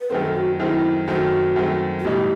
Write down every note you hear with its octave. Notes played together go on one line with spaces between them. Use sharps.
B4
F#2 D#3 A3 C4 A4
F#4
F#2 D#3 A3 C4 E4
F#2 D#3 A3 C4 F#4
F#2 D#3 A3 C4
F#4
B1 A2 E3 G3 D#4 G4